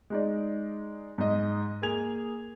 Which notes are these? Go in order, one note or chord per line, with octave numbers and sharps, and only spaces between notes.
G#3 D#4 D5
G#2 D#5
A#3 G#4 G#5 G#6 F7